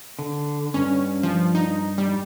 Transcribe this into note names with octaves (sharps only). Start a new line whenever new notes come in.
D3
G2 C#4
F3
D#4
G3